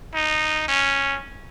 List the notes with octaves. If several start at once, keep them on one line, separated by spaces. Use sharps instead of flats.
D#4
C#4